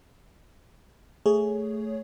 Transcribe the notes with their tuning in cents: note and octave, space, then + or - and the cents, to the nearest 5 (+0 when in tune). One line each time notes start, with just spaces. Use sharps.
A3 +0 G#4 +0 C#5 +10